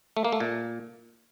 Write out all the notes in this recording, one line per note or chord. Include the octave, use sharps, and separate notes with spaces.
A3
A#3
A3
A#2